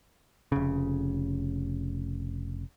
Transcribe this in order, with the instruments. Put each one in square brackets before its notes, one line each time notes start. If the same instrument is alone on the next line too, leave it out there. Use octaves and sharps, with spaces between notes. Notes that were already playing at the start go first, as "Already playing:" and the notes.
[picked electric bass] F1 C#3